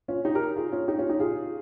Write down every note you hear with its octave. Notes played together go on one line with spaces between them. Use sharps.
C#4 F4
D#4 G4
G4 A#4
F4 G#4
C#4 F4
D#4 G4
C#4 F4
D#4 G4
F4 G#4